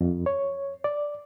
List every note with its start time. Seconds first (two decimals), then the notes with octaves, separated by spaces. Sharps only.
0.01 F2
0.26 C#5
0.84 D5